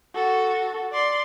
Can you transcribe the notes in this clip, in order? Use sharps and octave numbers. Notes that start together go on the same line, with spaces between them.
F#4 A4
D5 C6